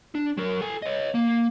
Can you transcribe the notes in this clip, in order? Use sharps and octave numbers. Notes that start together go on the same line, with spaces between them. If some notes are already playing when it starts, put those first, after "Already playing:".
D4
F#3 A#4
A4 G#5
C#5 D#5
A#3